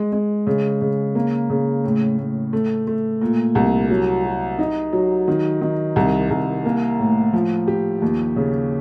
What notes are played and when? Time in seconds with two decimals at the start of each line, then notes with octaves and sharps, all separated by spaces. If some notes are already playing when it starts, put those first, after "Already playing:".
Already playing: G#3
0.12 G#3
0.47 C#3
0.81 C#3
1.15 A#3
1.50 C#3
1.84 A2
2.18 A2
2.53 A3
2.87 A3
3.22 A#2
3.55 C2
3.90 F#3
4.25 F#3
4.59 D#4
4.93 F#3
5.28 D#3
5.61 D#3
5.96 C2
6.31 C2
6.65 A#3
6.99 A2
7.33 F3
7.68 G4
8.02 D#2
8.36 C#3